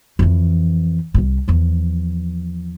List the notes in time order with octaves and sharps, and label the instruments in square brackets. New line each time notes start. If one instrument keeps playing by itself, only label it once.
[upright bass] F2 E3
D1 C2
E2 F3